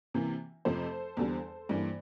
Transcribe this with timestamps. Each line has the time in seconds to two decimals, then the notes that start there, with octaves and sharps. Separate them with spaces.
0.14 C3 E3 A#3
0.65 F2 C3 F3 A3 A4 C5
1.17 E2 D3 G3
1.69 G2 E3 A#3